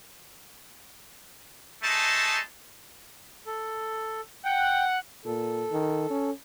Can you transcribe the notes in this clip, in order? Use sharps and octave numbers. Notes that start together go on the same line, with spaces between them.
G#3 A3 D#4 A5
A4
F#5 G5
A#2 A4
D#3
C#4